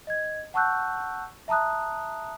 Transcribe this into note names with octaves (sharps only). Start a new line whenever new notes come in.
D#5 G#6
F#5 A5 C#6 E6 F#6 G6
E5 A5 A#5 D#6 F#6